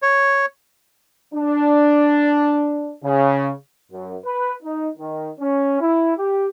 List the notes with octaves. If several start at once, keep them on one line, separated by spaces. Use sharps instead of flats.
C#5
D4
C#3
F#2
B4
D#4
D#3
C#4
E4
G4